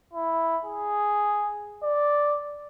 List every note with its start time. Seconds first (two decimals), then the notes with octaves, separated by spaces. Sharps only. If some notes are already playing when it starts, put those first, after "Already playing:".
0.13 E4
0.64 G#4
1.83 D5